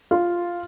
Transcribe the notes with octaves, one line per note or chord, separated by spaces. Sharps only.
F4